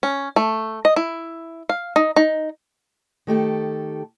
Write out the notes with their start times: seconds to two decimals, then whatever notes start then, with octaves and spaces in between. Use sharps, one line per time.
0.03 C#4
0.36 A3
0.85 D#5
0.96 E4
1.69 F5
1.96 D#4
2.16 D#4
3.27 D#3 A3 G4 A4